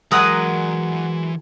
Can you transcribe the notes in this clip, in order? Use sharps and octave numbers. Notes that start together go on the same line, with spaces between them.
E3 F#3 G#3 A#4 F#5 A#5 D#6